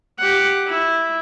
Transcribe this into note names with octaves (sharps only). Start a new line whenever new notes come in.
G4 F#5
E4